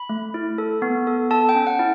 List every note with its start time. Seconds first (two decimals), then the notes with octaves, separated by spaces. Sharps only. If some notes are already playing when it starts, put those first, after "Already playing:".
Already playing: B5
0.09 A3
0.34 E4
0.58 A4
0.82 B3
1.07 A4
1.31 A4 A5
1.49 G5
1.55 C#4
1.67 F#5
1.79 E4